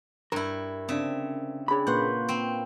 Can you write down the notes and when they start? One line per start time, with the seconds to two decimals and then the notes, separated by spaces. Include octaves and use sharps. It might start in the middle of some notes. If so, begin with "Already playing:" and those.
0.32 G2 E4 A#4
0.89 C#3 C4 D4 E5
1.68 C#4 D4 G#4 C#5 B5
1.87 A#2 A#3 B4 F#5 C6 C#6 G6
2.29 C4